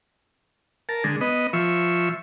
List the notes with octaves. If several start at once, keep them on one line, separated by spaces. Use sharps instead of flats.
A#4 A5
D3 G#3
B3 D#5
F3 E5 C#6